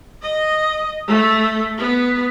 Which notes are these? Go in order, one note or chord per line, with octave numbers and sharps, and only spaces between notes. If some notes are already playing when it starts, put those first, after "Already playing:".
D#5
A3
B3